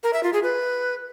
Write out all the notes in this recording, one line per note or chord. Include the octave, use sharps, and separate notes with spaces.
A#4
E5
F4
G#4
B4